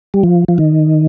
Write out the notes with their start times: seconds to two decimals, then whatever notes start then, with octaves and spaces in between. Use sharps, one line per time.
0.14 G3
0.23 F3
0.48 F3
0.58 D#3